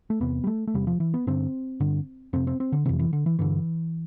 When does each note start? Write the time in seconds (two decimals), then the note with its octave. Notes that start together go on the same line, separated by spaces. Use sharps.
0.10 A3
0.20 E2 C3 B3
0.44 G3
0.47 A3
0.67 A3
0.74 E2 C3 G3
0.87 F3
1.00 E3
1.14 B3
1.27 G2 D3 C4
1.80 G2 D3
2.33 F2 C3 C4
2.47 C4
2.60 C4
2.72 D3
2.86 F2 C3 E3
2.99 E3
3.13 D3
3.26 E3
3.39 G2 D3 E3